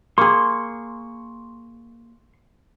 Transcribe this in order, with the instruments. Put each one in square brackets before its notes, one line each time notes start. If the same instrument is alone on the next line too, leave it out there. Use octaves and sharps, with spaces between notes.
[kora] A#3 G#4 [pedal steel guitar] C6 C#6